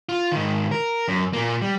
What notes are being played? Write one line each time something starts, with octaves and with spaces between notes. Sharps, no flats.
F4
G#2 D#3
A#4
F#2
A#2 A#3
G3